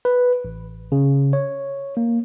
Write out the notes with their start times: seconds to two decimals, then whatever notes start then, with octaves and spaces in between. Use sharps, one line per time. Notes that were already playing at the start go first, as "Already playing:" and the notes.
0.05 B4
0.45 A1
0.92 C#3
1.33 C#5
1.97 A#3